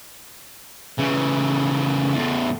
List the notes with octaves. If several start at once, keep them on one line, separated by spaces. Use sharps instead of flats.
C#3 E3
E2 A2